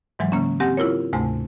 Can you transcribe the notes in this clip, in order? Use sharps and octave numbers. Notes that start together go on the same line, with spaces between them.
G#2 E3 F#3 G#3
C#3 A#3 C#4
C4 G4 F#5 G#5 A#6
E4 F4 A#4 C#5
D2 G#2 C3 A3 G#5